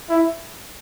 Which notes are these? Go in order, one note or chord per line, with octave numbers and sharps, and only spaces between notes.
E4